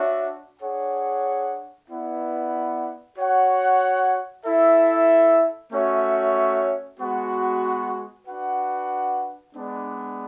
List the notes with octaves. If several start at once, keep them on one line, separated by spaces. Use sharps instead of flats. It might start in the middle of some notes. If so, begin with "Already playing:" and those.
Already playing: D4 F#4 C#5 E5
D4 G#4 C#5 F#5
B3 E4 B4 D5 F#5
F#4 C#5 F#5
E4 A4 E5
A3 C#4 F#4 C#5 E5
G#3 B3 F#4
D4 F#4 B4 F#5
G#3 B3 D4